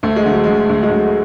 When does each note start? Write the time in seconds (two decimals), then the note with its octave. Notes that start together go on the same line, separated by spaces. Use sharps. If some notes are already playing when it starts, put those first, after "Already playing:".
0.03 D2 A3
0.16 G#3
0.25 D3
0.31 F#3
0.44 D3 G#3
0.69 D2
0.83 G#3
0.90 D2 F#3